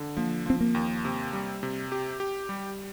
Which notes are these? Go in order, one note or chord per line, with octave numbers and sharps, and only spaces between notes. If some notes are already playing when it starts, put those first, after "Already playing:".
Already playing: D3
F3 A#3
F3 C4
A#3
D#2
C3
G3
C3
G4
G4
G3